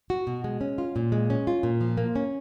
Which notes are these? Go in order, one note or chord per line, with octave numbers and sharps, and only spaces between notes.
F#4
B2
G#3
C#4
F4
A#2
G#3
C#4
F4
A#2
F3
A#3
C#4